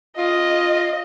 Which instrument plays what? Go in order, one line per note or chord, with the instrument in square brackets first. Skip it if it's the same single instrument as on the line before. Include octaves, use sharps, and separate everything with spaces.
[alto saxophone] F4 [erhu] D#5